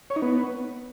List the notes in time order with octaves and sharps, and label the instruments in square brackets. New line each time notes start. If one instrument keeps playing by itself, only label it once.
[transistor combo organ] C#5
D#4
B3